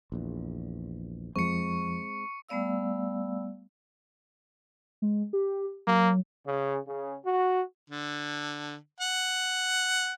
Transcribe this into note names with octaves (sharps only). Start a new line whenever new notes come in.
A#1 E2
F2 F3 G#3 C4 C#6 C#7
G3 A3 B3 D5 F5 E6
G#3
G4
F#3 A#3
C#3
C#3
F#4
D3
F#5